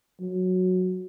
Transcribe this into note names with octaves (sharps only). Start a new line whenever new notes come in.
F#3